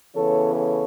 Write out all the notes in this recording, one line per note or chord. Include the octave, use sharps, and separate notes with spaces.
C#3 E3 B3 A4 C#5
A4 C#5